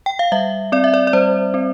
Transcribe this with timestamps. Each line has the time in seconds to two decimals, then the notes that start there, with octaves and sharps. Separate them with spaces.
0.06 G5
0.19 F5
0.32 G3 E5
0.72 C4 D5
0.84 E5
0.94 D5
1.07 D5
1.13 G3 C5
1.54 C4